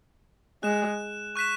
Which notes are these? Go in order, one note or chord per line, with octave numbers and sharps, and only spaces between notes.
G#3 F#6 E7
C#6 F#6 B6 E7